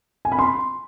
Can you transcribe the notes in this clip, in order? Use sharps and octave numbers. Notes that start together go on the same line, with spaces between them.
G#5
B5
C6